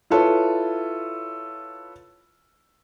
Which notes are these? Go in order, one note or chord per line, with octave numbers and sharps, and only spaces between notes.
E4 F4 A4 B4 C#5